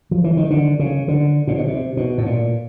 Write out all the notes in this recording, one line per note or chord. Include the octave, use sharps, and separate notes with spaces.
F3
E3
D#3
D3
C#3
D3
A#2
B2
C3
B2
A2
A#2